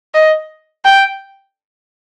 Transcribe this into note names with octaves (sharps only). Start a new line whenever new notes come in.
D#5
G5